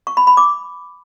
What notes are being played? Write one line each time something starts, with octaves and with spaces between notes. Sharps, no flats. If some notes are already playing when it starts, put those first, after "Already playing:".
C#6
B5
B5
D6